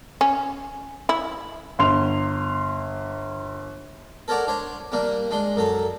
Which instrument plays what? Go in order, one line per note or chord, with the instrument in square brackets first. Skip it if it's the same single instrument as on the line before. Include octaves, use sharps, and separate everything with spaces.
[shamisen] C#4
E4
[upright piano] G1 C6 F7
[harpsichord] A4 A#4 C#5 D5 F#5
D4 C5 C#5
G3 A#3 D4
G#3 D4 C6
F#2 F#3 A4